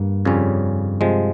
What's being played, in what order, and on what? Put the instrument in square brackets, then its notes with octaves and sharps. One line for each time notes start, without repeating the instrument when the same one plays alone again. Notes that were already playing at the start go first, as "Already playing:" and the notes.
Already playing: [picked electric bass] G2 [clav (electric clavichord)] A#3
[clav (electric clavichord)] F2 C#3 G3 C#4
C3 F3 G#3